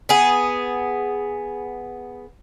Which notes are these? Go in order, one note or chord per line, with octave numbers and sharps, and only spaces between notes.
B3 G#4